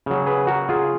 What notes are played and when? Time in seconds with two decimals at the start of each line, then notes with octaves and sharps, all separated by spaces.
0.06 C#3 F#3
0.27 G#4 B4
0.47 F#4 A#4
0.69 F4 G#4